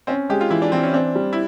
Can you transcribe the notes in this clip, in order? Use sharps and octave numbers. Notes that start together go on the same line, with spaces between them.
C4 C#4
G#3 G4
F4
E3 E4
D4
E3 C4
C#4
C4 D4
G3
E4